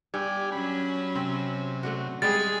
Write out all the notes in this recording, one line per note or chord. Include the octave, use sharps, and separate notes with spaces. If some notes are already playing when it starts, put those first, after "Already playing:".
G2 G4 D5 G#5
F#3 C#4 B5
C3 C4
A3 D4 F#4
G3 G#3 G#4 A6